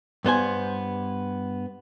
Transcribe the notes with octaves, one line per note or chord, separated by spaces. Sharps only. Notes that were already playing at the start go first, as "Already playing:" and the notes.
G2 B3 C5 G#5